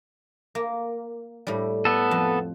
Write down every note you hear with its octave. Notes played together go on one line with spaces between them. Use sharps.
A#3
A2 G3
B3 A4
F2